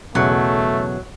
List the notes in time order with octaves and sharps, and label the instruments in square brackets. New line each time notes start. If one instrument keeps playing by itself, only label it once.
[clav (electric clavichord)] B1 E2 C#3 [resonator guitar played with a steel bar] F#3 [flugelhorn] A3